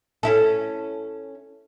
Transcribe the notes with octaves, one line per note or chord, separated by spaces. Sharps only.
C#4 E4 A4